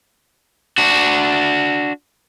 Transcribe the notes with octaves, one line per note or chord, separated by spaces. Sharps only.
D4 F#4